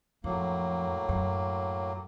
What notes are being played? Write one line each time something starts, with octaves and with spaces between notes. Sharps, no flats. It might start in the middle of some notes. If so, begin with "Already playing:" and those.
F2 A2 F#3 A#3
F#2